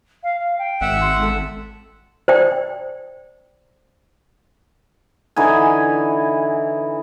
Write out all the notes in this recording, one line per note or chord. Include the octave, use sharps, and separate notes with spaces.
F5
F5
G5
G#1 E5 F#5
C6
A4
C5 D5 G5
D3 E3 D#4 G#5